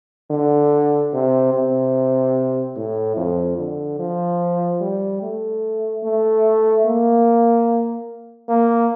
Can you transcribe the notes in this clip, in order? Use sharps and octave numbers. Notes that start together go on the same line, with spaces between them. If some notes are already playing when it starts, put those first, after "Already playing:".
D3
C3
C3
A2
F2
D3
F3
G3
A3
A3
A#3
A#3